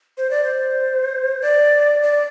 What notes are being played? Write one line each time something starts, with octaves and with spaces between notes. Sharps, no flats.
C5
D5
C5
D5
D5